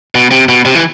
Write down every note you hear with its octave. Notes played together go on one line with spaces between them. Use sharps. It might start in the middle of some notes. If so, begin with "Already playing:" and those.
B2
C3
B2
C3
E3